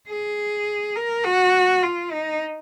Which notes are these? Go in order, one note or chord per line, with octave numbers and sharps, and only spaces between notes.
G#4
A#4
F#4
F4
D#4